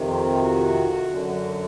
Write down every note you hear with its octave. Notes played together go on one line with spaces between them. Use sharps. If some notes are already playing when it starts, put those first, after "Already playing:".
Already playing: F2 C3 D#3
C4
F#4
F#2 D3